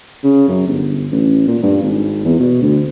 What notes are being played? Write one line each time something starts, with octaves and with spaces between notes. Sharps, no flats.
C#3
F#2
G1
A1
A#2
G2
G#1
E2
B2
D2